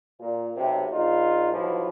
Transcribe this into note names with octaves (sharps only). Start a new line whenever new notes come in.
A#2
B1 C3
A#1 D#4 F4
B1 E3 F3